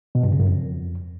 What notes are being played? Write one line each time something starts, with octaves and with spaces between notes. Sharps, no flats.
B2
G2
C#3
F#2
F2